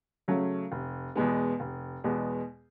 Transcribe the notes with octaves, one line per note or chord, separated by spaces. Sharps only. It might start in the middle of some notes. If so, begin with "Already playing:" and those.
C#3 F#3 A3 C#4
F1
E2 B2 G#3 B3
F1
E2 B2 G#3 B3